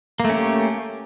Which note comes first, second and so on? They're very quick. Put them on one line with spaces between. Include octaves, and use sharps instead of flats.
A#3 A3 C#4 G4